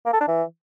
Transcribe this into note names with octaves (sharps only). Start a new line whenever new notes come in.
A#3
A4
D4
E3